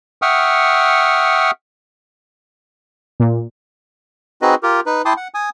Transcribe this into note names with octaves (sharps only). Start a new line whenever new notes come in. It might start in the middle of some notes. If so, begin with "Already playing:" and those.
E5 F#5 G5 C#6 D#6 F6
A#2
C4 D#4 F#4 G#4 B4 D#5
F4 G4 A#4
D#4 B4
E4 G5 A5 C6 D6 D#6
F#5
G#5 D#6